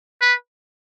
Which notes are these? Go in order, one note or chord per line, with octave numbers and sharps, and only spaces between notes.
B4